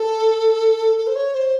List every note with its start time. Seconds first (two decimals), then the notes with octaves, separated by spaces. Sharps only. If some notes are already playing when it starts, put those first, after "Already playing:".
Already playing: A4
0.98 A4
1.07 C5
1.16 C#5
1.35 C5